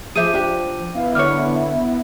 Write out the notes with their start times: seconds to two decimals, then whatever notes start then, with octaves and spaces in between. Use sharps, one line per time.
0.16 F3 G#4 C5 E5 D6 G6 D#7
0.33 D4 G4
0.95 B3 E4 F5
1.15 D3 D4 C#5 F6
1.55 E5